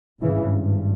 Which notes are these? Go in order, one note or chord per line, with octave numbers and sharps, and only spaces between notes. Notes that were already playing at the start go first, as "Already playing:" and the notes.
G#1 G2 C#3 E3